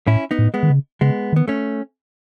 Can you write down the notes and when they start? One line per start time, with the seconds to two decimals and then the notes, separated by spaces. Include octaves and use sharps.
0.07 A2 C#4 E4
0.31 B3 D#4
0.39 A2
0.54 G#3 B3
0.63 D#3
0.70 C#3
1.01 C#3 G#3 B3
1.33 D#3 B3
1.48 A3 C#4